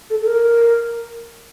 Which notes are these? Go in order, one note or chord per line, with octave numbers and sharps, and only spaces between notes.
A4
A4
A#4